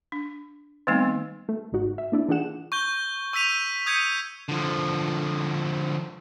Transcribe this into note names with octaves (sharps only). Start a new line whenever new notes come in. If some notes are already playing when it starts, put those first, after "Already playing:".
D4
D#3 G3 A3 B3 C4 D#4
A3
G1 G#2 D#4 F#4
E5
A#3 D4 E4
E3 D4 F4 G#4 F#5 E7
C#6 G6 G7
C#6 E6 G6 B6 D#7 F7
D#6 G6 G#6 B6 C#7 D#7
D3 F3